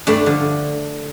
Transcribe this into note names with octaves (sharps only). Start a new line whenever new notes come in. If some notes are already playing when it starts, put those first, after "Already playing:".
G2 A3 D4
D3 F3